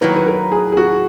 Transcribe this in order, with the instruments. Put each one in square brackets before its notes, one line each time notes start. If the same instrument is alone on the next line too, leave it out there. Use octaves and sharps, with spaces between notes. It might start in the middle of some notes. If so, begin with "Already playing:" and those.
[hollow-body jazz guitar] D#3 F#3 A#3 E4 [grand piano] B4
[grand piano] B4
A#4
G#4
G#4
F#4